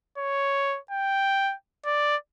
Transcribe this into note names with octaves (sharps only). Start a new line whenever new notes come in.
C#5
G5
D5